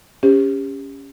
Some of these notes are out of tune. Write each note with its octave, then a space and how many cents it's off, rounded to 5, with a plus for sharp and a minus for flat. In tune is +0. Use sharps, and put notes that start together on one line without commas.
C#4 +10 G4 +25 C5 +0